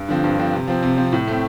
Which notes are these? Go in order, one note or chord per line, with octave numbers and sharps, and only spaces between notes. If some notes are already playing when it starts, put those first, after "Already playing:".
Already playing: G2
D3 F3 C4
G2
D3 F3 C4
C3
F3 C4
C3
F3 C4
A2
A3 C4